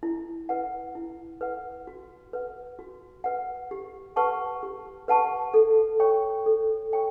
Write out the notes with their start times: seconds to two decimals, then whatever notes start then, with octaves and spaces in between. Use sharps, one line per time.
0.03 E4
0.49 B4 F#5
0.95 E4
1.41 B4 F#5
1.87 F#4
2.33 B4 F#5
2.79 F#4
3.24 B4 F#5
3.71 G4
4.16 B4 F#5 A5 C#6
4.63 G4
5.08 B4 F#5 A5 C#6
5.54 A4
6.00 C#5 G5 C#6
6.46 A4
6.92 C#5 G5 C#6